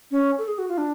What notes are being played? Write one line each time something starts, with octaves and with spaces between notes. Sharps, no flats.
C#4
A4
G#4
F#4
F4
D4